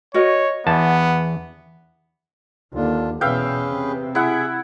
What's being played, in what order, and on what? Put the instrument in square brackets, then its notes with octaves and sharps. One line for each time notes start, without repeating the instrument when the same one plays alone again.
[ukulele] F#4 A#4 D#5 [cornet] C#5
[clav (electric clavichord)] E2 A5 [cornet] B3
[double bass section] D#2 [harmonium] D3 D4 F4
[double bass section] E2 B2 [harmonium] C#4 G#4 B4 [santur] E5 F5 G5
[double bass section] C3
[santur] E4 F#5 [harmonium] G#4 E5